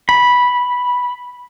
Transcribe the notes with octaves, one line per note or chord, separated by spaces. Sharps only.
B5